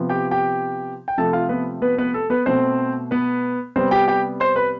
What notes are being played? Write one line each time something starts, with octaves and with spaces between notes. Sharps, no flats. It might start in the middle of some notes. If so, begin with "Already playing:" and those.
Already playing: C3 F3 B3
G4 G5
G4 G5
G5
C3 F3 A3 A4 A5
F4 F5
B3 B4
B3 B4
B3 B4
A4
B3 B4
B2 A3 C4 C5
B3 B4
C3 G3 B3 C4 C5
G4 G5
G4 G5
C5 C6
B4 B5